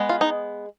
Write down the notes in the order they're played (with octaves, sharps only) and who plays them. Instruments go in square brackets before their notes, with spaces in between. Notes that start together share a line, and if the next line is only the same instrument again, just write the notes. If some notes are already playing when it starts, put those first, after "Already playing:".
Already playing: [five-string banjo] G#3 B3
F4
D#4